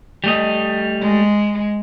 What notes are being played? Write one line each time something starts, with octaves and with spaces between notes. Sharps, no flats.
G3 A3 D#5
G#3